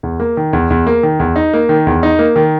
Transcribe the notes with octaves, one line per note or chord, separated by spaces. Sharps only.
E2
A#3
D#3
E2
E2
A#3
D#3
E2
D#4
A#3
D#3
E2
D#4
A#3
D#3